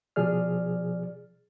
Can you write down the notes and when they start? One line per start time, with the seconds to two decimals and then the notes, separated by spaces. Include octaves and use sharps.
0.16 B2 F3 G#4 D5 F6